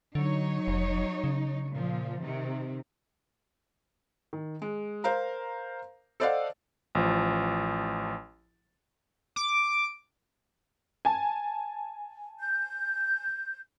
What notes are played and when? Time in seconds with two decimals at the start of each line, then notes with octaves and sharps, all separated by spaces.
0.15 D3 F#3 D#4 C#5
0.68 F1
1.24 C#3
1.71 A#2 F3
2.21 C3 D#3
4.33 D#3
4.62 G#3
5.04 A#4 C5 F5 A#5
6.20 A4 C5 D5 D#5 F5 F#5
6.95 A1 F3
9.36 D6
11.05 G#5 A5
12.39 G6